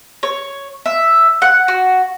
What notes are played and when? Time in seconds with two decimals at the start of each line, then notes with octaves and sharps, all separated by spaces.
0.23 C#5
0.86 E5
1.42 F#5
1.68 F#4